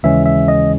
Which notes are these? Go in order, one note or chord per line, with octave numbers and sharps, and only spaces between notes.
D#2 C#3 E3 G#3 C#4 E5
E5
D#5